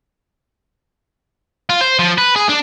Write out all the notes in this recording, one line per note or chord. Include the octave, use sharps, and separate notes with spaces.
F4
C5
F3
B4
G#4
D4